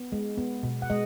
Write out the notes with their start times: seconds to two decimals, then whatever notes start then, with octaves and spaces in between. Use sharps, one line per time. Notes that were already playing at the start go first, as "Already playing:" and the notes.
Already playing: B3
0.12 G#3
0.38 B3
0.63 B2
0.82 F#5
0.90 G#3 D#5